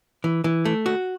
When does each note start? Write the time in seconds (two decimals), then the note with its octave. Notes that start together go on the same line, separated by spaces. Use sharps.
0.24 E3
0.44 E3
0.65 A3
0.86 F#4